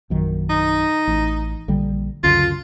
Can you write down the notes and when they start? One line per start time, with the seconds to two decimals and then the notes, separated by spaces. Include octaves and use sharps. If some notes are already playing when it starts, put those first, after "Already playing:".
0.10 A#1 F#2 D#3
0.50 D#4
1.07 A1
1.68 A#1 D3 G3
2.23 C#2 F#2 D3 F4